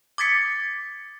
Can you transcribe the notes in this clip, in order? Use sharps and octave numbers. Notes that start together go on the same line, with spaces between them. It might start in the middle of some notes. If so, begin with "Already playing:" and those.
D6 D#6 G#6 A6 B6 C#7